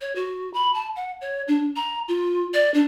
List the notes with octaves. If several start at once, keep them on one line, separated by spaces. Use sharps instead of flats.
C#5
F#4
B5
A5
F#5
C#5
D4
A#5
F4
D5
D4